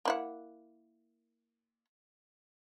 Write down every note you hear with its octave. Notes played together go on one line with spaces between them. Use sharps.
A#3 E4 F#5